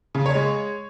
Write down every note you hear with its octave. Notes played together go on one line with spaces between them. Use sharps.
C#3
C#5
G#3